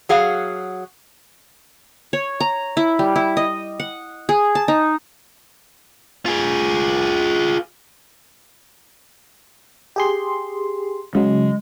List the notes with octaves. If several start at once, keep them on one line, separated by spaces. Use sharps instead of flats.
F#3 G#4 F5 F#5
C#5
A#5
E4
G3
E4
D#5
F#5
G#4
A5
D#4
F4 G#4
G4 G#4 C6
C#3 F#3 G#3